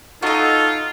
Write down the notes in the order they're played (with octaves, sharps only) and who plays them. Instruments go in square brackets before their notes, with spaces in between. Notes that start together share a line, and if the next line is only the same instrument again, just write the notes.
[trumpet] D#4 [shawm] F4 [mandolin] F#4 D#5 [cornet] A4